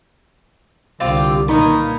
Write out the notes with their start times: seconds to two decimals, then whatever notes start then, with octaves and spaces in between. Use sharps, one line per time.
1.00 C2 D3 C4 F4 G4
1.48 A#2 D#3 A#3 B3 D#4